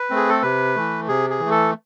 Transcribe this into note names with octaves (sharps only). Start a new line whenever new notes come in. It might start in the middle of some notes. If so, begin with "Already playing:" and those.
Already playing: B4
A3 C4
G#4
A4
C3 B4
E3 A3
C3 G#4
G#4
E3
A3
A4